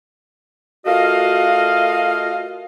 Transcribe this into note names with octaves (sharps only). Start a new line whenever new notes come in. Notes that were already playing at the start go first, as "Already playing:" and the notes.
A3 F4 F#4 A#4 D#5 F5